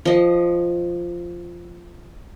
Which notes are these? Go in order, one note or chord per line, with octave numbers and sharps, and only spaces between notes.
F3 D#5